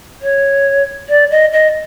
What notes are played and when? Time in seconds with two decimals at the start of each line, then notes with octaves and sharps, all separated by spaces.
0.21 C#5
1.09 D5
1.31 D#5
1.52 D#5